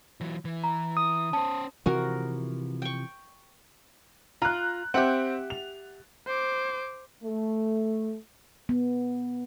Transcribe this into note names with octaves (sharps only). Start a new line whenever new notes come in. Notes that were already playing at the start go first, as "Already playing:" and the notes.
E3 F#3
E3
A#5
D#6
C#4 C5 A5
C3 E3 F3 F#4 A#4
G5 C#6
F4 A#5 F#6
C4 G4 E5 F#5
F7
C5 D6
A3
B3